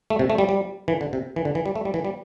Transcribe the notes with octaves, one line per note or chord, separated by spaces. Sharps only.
A3
C3
A3
G3
G3
E3
D3
C3
E3
D3
E3
G3
A3
G3
E3
G3